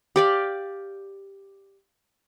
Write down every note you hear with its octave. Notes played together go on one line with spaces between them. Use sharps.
G4 D5 F5